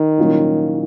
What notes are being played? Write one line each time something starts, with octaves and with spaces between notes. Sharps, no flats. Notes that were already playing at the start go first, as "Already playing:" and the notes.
Already playing: D#3
C2 A#2 F#3 A#3 C#4